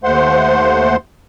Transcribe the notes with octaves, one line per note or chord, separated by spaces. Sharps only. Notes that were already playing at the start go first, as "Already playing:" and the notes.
D#2 A3 C5 F#5 C6